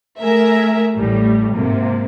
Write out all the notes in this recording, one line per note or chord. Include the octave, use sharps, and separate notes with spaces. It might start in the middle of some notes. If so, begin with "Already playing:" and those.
A3 G#4 A#4 E5
A1 A2 G3
G#2 C3 A#3